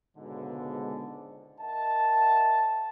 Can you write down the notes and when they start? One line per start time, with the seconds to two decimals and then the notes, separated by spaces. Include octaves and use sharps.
0.17 C#2 G#2 B2 D3
1.60 A#4 D#5 E5 F#5 A5